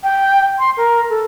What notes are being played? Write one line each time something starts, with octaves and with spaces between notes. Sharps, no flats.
G5
C6
A#4
A4